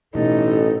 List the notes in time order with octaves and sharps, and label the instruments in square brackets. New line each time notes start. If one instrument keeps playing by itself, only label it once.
[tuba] A1 [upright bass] B2 [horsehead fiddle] D#4 [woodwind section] A4